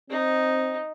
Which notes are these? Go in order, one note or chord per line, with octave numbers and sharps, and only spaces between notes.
C4 D#4